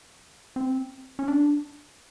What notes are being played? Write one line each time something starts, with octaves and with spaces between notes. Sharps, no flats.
C4
C#4
D4